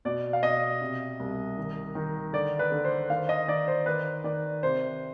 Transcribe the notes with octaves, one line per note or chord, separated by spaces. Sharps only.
B2 D5
F5
B2 D#5
C3
C2
D#3
D#3
D3 D5
B4
D3
C5
D#3 F5
D#5
D#3 D5
C5
D#3 B4
D#3 D5
C3 C5